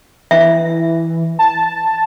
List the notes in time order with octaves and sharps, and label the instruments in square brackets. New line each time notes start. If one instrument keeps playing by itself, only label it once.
[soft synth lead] E3 [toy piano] E5
[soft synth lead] A5